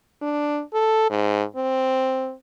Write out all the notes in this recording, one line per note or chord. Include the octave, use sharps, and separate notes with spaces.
D4
A4
G#2
C4